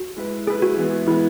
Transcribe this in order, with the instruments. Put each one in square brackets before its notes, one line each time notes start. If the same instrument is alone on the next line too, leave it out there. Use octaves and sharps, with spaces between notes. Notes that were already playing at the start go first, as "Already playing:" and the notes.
Already playing: [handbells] F#4
[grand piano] G#3 E4 B4
[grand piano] G#3 E4 B4 [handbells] G#4
[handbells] F#4
[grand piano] E3 G#3 B3
[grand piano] E3 G#3 B3 [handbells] E4